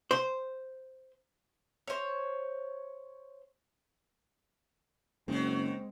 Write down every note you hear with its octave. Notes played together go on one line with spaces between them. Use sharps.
C5
C5 C#5
F#1 D#3 F#3 G#3 C4